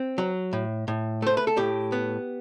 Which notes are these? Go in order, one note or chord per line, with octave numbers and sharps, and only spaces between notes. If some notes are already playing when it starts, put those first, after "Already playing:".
Already playing: C4
F#3
A2
A2
A3 C5
B4
A4
A2 G4
B3